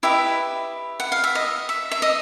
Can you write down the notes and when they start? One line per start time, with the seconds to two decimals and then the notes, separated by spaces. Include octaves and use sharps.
0.03 E4 G4 B4 D#5 E5
1.00 F#5
1.12 F5
1.24 E5
1.35 D#5
1.69 E5
1.91 E5
2.02 D#5